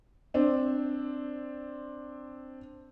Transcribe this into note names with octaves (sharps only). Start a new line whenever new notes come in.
C4 D4